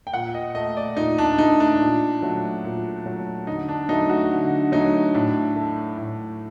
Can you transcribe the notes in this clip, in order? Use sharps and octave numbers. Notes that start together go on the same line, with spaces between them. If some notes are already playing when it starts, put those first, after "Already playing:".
G5
A#2 F#5
D#5
A3 D#5
D5
A#2 D#4
D4
A3 D#4
D4
A#2
F#3 A3
A#2
F#3 A3
D3 D#4
D4
F#3 A3 D#4
F#4
D3
F#3 A3 D#4
A2 D4
A3
A2